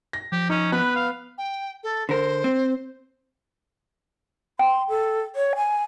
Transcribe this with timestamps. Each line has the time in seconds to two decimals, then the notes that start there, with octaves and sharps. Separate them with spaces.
0.13 A#6
0.32 F3 G4
0.49 C#4 D#4
0.72 B3 B4
0.95 F5
1.38 G5
1.83 A4
2.09 D3 A#4 C5
2.44 C4
4.59 G5 C6
4.89 A4
5.36 C#5
5.56 G#5